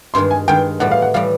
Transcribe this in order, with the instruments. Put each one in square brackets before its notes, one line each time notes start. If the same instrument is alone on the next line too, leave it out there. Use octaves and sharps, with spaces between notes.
[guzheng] G2 D#3 G#3 [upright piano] C6
[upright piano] G#5
[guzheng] G2 D#3 G#3 [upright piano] G5
[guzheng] A2 E3 G3 [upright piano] F#5
[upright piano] F5
F#5
[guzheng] A2 E3 G3 [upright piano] F5